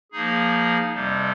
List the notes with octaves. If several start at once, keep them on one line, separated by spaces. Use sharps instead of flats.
F3 A#3 D#4 G#4
F2 C3 G3